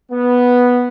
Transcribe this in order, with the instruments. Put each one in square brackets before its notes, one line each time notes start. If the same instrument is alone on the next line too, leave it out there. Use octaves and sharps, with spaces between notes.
[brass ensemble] B3